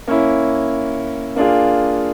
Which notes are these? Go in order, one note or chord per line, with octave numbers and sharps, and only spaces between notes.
A#3 C#4 E4
A#3 D4 F4 G#4